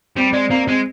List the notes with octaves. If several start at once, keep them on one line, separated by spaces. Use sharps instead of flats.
G3 C4
G#3 D5
A#3 C4
G#3 C4